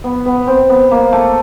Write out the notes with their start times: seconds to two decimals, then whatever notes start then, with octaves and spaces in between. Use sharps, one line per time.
0.04 B3
0.26 B3
0.47 C4
0.70 B3
0.91 A#3
1.13 A3